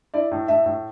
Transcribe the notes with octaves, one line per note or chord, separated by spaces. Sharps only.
E4 D5
A2
A2 E5
A2